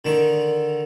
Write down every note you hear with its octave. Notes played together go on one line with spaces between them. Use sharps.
D3 D#3 C#6